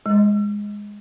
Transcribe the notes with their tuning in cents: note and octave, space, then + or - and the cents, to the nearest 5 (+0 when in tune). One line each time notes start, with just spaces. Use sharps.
G#3 -10